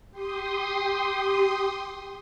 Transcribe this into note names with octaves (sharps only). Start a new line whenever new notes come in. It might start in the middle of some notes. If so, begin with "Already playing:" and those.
G4 C6 D#6